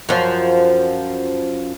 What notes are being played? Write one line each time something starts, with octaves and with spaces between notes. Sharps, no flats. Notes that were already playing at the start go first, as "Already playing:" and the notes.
F#2 F3